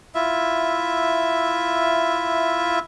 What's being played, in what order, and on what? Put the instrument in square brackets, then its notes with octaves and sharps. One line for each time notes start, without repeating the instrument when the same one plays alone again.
[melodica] E4 F4 E5